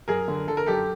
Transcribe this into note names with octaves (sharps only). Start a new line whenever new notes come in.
F#2 G#4 A#4
D3
D3 A4
A#4
F#2 G4 A4